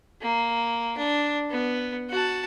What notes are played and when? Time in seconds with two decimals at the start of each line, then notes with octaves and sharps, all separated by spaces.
0.21 A#3
0.97 D4
1.51 B3
2.10 F#4 A5